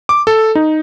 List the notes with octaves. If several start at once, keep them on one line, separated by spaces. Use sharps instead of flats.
D6
A4
D#4